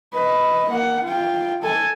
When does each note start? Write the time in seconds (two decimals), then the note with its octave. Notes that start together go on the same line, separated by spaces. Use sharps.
0.13 B4 D#5
0.70 A#3 F#5
1.04 F4 G5
1.62 A4 G#5